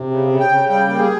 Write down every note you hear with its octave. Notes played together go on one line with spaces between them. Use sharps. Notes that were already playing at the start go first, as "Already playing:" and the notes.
Already playing: C3
C#3
C#3
G5
C#3
G3 G5
A#3
G#4